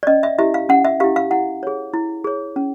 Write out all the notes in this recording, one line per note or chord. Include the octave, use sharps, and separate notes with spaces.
D5
C#4 D#5
E5
E4 G4 E5
F5
C#4 F#5
E5
E4 G4 F5
F5
E4 F#5
G#4 C#5
E4
G#4 C#5
C#4